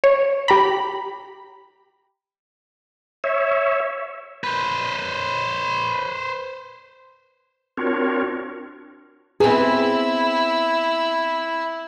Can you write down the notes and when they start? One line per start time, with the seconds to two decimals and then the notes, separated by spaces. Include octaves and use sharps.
0.04 C#5
0.48 G4 A#5 B5
3.24 C#5 E5
4.44 B4 C5
7.77 C4 D4 F4 F#4 A#4 C#5
9.40 B3 C4 E4 G#4